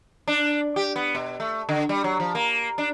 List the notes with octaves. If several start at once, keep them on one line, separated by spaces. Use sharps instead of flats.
D4
G4
B3
B2
A3
D3
G3
F#3
F3
A#3
D4